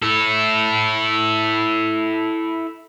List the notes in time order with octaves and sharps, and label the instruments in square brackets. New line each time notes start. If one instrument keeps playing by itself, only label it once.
[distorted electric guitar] E4 A4